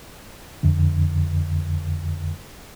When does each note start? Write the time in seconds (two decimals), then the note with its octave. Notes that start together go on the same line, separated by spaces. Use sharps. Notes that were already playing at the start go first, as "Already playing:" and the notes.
0.63 F2 D3